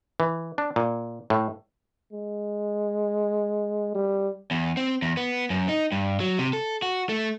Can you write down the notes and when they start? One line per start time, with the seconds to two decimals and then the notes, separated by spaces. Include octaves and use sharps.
0.20 E3
0.58 D4
0.76 A#2
1.30 A2
2.13 G#3
3.95 G3
4.51 E2
4.77 C4
5.02 E2
5.17 B3
5.50 F#2
5.69 D#4
5.92 G2
6.20 F#3
6.39 C3
6.53 A4
6.82 F#4
7.09 A3